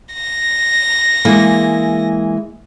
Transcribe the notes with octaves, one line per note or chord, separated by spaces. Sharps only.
A#6
E3 G#3 A#3